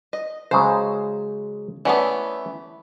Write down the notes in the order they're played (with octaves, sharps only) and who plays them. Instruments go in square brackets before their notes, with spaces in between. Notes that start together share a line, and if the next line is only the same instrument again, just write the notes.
[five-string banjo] D#5
[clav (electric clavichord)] C#3 F#3 G#3 [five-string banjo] C5
[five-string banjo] E3 A3 B3 [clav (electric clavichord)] C#4 D5 F#5